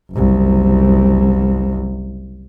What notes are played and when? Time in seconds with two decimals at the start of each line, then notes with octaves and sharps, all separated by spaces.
0.11 F#1 C2